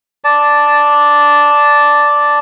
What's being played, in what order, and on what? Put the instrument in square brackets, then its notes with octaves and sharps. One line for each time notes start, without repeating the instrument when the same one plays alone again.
[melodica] D5 A5